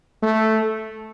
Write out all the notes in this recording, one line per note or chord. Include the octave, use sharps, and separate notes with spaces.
A3